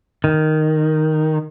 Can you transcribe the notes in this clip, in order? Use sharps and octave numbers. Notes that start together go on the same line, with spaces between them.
D#3